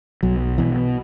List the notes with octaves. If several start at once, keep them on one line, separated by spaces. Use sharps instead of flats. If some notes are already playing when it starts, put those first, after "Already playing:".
B1 F#3
B2 E3